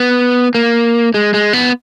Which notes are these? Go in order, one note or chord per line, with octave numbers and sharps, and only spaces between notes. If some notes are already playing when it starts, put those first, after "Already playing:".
Already playing: B3
A#3
G#3
G#3
B3